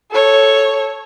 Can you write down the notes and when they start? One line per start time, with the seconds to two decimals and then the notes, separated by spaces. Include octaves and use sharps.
0.12 A4 C#5